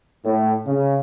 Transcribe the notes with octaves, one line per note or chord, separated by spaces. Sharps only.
A2
C#3